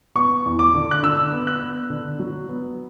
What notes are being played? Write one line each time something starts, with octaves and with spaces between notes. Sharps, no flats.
B3 C#6
E2
D6
D3
F#6
D3 E6
B3
F#6
B3
D3
F#3
B3